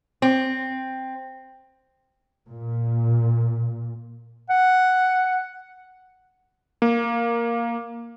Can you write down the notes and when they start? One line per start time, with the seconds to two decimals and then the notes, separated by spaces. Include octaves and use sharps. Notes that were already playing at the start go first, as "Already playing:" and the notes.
0.22 C4
2.49 A#2
4.50 F#5
6.82 A#3